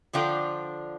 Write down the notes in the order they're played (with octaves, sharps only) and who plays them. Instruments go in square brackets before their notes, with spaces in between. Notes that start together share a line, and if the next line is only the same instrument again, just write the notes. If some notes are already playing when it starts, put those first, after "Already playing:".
[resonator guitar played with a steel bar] D3 F3 D4 F4 G5